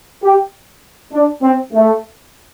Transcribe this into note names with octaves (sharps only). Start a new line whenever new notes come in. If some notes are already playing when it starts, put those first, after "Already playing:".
G4
D4
C4
A3